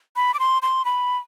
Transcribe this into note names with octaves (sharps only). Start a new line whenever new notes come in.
B5
D6
C6
C6
B5